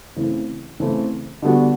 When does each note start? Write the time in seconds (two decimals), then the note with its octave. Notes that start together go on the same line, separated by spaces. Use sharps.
0.16 C#3 E3 A3 C4 E4
0.80 C#3 E3 A3 C4 E4
1.42 D3 G3 B3 D4 F#4